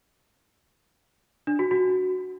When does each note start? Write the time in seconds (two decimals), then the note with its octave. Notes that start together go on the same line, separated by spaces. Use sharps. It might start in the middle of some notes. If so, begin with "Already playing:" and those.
1.47 D4
1.59 F#4
1.71 F#4